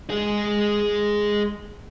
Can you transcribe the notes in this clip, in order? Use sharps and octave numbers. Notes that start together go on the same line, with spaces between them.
G#3 G#4